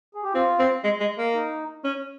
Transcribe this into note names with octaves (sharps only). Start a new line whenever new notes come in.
G#4
G4
C4 F4
C4
G#3
G#3
A#3
D#4
C#4